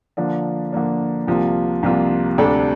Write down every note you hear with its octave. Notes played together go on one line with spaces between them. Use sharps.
D3 F3 A#3 D4
D3 F3 A#3 D4
C2 C3 F3 A#3 F4
C2 C3 F3 A#3 F4
D2 C3 G3 D4 A4